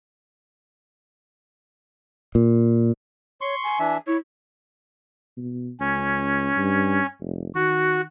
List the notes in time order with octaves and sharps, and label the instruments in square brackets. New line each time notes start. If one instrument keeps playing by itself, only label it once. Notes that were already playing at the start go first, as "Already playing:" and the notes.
[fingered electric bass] A#2
[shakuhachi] C#5 [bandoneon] C6 C#6
[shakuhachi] G#5
[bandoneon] E3 D4 E5
[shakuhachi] E4 [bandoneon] C#5
[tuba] B2
[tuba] C#2 [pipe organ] C#4
[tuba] G2
F1
[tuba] D#3 [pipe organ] F#4